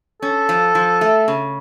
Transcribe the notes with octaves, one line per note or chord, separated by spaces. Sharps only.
C#4 A4
F3
F3
A3
C#3